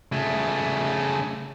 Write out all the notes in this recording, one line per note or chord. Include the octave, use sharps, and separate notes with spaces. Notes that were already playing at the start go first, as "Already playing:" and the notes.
C#3 A3